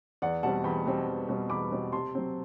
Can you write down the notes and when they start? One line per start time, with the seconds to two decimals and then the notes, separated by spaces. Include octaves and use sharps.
0.22 E2 D5 F#5
0.43 B2 G3 C4 F#5 A5
0.64 E2 G5 B5
0.86 B2 G3 C4
1.08 E2
1.29 B2 G3 C4
1.50 E2 B5 D6
1.72 B2 G3 C4
1.92 C3 A5 C6
2.15 F#3 C4